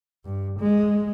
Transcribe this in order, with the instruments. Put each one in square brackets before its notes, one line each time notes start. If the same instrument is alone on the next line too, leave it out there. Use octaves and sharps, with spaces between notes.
[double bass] G2
G#3